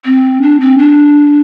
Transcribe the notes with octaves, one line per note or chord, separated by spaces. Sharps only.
C4
D4
C4
D4